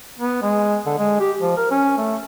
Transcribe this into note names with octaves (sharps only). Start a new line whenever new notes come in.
B3
G#3
D3
G#3
G4
F3
A#4
C#4
A3